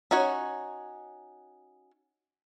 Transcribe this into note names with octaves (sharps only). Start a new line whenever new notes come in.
C#4 D#4 F#4 C#5